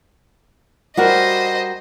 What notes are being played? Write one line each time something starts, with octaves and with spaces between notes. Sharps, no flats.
G3 F#4 A#4 C5 D#5